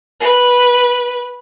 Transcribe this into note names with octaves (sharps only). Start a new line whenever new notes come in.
B4